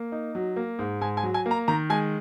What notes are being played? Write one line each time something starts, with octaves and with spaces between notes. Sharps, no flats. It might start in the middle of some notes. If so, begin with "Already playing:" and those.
Already playing: A#3
D#4
F#3
A#3
G#2
G#2 G#5
G#5
F#3
G#5
A#3
A#5
D#3 A#5
G#3 G#5